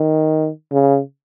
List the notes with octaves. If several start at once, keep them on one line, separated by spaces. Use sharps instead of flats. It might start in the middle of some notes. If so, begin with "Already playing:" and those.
Already playing: D#3
C#3